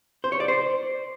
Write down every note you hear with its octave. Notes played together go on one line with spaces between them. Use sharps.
C5
C#5
D5
C5